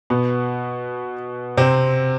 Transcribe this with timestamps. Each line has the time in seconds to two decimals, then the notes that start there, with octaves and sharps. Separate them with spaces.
0.10 B2 B3
1.57 C3 C4